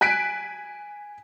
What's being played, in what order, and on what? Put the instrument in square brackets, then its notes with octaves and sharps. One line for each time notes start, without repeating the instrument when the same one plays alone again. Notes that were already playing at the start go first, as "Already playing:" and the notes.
[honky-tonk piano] G#5 F#6 B6 D7